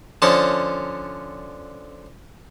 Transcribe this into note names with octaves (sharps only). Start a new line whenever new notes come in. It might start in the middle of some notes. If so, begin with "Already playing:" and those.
D3 F3 C#4 D#5 A5